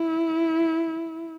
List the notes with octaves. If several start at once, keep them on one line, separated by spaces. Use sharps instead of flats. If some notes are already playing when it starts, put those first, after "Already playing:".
Already playing: E4